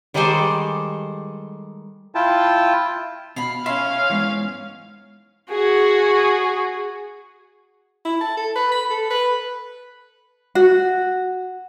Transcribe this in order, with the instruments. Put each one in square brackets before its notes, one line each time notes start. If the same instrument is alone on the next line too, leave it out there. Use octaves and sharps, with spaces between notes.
[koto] D#3 G3 G#3 A4 C5 D5
[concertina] E4 F4 G5 A5
[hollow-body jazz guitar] B2 [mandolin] F5 B5
[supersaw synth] C#4 [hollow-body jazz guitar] E5 [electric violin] F5 [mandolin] C6
[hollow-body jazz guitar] E2 G#2 E3
[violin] F#4 G#4
[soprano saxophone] E4
A5
A4
B4
B5
A4
B4
[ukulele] F#4